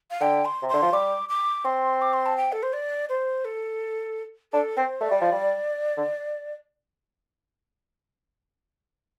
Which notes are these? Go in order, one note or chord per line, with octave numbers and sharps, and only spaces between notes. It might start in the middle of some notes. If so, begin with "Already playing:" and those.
F5
D3 G5
C6
C3
D3 C6
F3
G3 D6
D6
C4 C6
D6
C6
A5
G5
A4
C5
D5
C5
A4
D4 A4
C4 C5
A3 D5
G3
F3
G3
D3